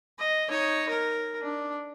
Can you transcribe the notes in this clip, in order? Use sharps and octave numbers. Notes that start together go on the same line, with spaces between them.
D#5
D#4 C#5
A#4
D4